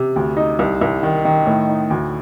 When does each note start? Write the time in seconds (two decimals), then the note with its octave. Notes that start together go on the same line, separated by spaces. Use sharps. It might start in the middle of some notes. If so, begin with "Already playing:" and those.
Already playing: C3
0.16 D2
0.37 D#4
0.59 C2
0.81 C2
1.03 D#3
1.25 D#3
1.47 A2
1.69 D#4
1.90 D2